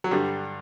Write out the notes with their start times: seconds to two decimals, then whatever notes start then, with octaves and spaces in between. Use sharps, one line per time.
0.04 F#3
0.11 G2 D3 G3